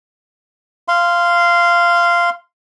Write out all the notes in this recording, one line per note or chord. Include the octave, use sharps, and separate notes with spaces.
F5 C6